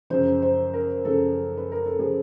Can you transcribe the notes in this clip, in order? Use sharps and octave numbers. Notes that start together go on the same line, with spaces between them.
F#2 C#3 F3 C5
C5
A#4
F#2 C#3 F3 A4
B4
A#4
A4
C#3 F3 G#4